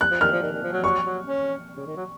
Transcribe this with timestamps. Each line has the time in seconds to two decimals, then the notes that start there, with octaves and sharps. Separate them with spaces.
0.01 F#6
0.11 F3
0.21 D#3 F6
0.32 F3
0.42 D#3
0.53 D#3
0.63 F3
0.72 F#3
0.84 F#3 C#6
1.04 F#3
1.24 C#4
1.77 C#3
1.87 D#3
1.96 F#3